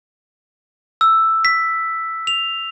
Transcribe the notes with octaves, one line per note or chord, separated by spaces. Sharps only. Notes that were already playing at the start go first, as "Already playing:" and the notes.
E6
B6
F7